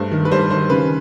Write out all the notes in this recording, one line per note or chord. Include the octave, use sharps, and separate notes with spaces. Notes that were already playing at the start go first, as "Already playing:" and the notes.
Already playing: G2 A3 C5
D#3
B4
G3 C5
D#3 C5
C#3 B4